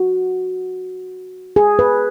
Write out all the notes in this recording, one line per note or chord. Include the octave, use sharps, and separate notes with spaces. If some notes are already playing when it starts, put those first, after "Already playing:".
Already playing: F#4
G#4
B4